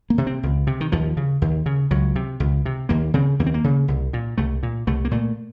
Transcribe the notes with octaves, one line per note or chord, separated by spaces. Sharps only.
A#3
C3
C4
C#2
C3
D#3
D#2 F3
C#3
D#2
C#3
C#2 F#3
C3
C#2
C3
D#2 A#3
C#3 C4
D#2 A#3
C4
A#3
C#3
C2
A#2
C2 A3
A#2
C2 A3
A#3
A#2 A3